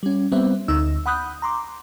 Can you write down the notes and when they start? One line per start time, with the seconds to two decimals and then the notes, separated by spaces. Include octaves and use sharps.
0.03 G3 C#4
0.32 G3 B3 C4 C5 E5
0.68 D2 D#4 E6
1.06 F#5 B5 D#6 F#6 G6
1.42 A#5 C6 D6